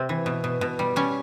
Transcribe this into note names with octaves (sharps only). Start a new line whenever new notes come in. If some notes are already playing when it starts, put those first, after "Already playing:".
Already playing: C3 C4
E3
B2
B2
B2
G3
G3 C#4